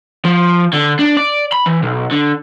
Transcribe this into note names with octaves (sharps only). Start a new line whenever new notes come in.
F3
D3
D4
D5
B5
E3
B1
D3